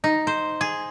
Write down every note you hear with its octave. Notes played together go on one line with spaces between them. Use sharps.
D#4
C5
G#4